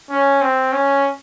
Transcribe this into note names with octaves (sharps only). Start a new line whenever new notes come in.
C#4
C4
C#4